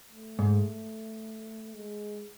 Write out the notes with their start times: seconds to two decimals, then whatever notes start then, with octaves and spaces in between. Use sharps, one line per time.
0.12 A3
0.39 G#2
1.75 G#3